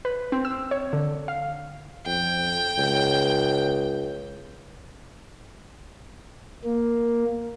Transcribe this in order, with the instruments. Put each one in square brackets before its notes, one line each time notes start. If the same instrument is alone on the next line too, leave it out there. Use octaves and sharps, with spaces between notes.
[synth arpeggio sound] B4
C4
E6
C#5
D3
F5
[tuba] F2 [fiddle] G5
[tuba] C#2
[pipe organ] A#3